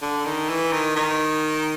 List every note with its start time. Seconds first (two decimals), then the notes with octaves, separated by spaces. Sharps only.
0.02 D3
0.25 D#3
0.49 E3
0.73 D#3
0.96 D#3